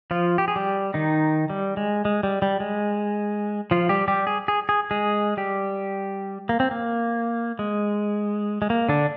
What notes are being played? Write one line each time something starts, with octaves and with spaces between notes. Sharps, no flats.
F3 F4
G4
G#4
G3 G4
D#3 D#4
G3
G#3
G#3
G3
G3
G#3
F3 F4
G3 G4
G3 G4
G#4
G#4
G#4
G#3 G#4
G3 G4
A#3
C4
A#3
G#3
G#3
A#3
D3 D4